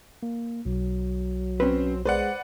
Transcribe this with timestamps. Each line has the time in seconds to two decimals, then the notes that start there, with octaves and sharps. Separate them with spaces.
0.23 A#3
0.66 B1 F#3
1.60 C4 C#4 B4
2.05 G#3 B4 C5 D5 F#5